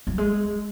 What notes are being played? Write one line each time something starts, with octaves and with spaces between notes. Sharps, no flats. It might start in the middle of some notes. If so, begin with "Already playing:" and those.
F#3
G#3